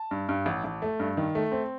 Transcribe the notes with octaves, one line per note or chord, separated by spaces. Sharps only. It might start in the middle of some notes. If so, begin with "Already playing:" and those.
Already playing: A5
G2
G2
A1
A1
A3
G2
D#3
A3
C4